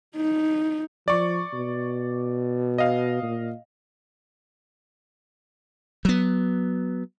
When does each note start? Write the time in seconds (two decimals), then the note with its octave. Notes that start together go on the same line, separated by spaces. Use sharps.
0.16 D#4
1.08 F3 D5 C#6
1.53 B2
2.78 D#5 F5
3.22 A#2
6.05 F#3 B3